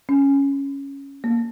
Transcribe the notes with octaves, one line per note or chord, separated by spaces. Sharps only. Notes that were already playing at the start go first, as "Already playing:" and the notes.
C#4
A#3